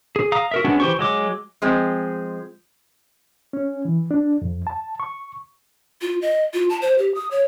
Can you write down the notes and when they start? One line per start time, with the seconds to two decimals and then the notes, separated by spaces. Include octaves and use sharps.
0.16 G#4
0.32 F5 A#5 D#6
0.51 F#4 A#4 E5
0.65 G#3 B3 C#4 D4 F#4
0.80 E3 G4 C5 C#6
0.99 F#3 G#3 D6
1.62 F3 G#3 C4
3.53 C#4
3.85 E3
4.11 D4
4.42 F2
4.67 A5
5.00 C#6
6.01 F4
6.22 D#5
6.54 F4
6.70 A5
6.82 C5
6.98 G4
7.15 D#6
7.31 C#5